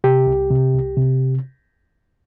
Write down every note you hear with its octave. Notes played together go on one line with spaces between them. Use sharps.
C3 G4
C2
C3
C2
C3